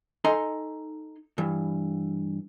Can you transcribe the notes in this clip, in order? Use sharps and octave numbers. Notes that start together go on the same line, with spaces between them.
D#4 A4 D#5 G#5 A#5 C6
G2 E3